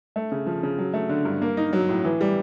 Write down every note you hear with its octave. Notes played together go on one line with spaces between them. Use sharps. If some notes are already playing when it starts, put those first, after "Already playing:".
A3
C#3
F3
C#3
F#3
A3
D3
G2
A#3
D#4
F#3
A2
E3
G3